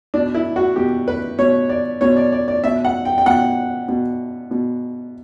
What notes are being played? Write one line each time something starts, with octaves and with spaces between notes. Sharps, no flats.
B2 D4
E4
F#4
B2 G4
B4
B2 C#5
D5
B2 C#5
D5
D5
D5
B2 E5
F#5
G5
G5
B2 F#5
B2
B2